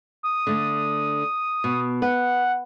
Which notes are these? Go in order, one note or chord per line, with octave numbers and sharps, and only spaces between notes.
D#6
D3 A3
B2
B4 F#5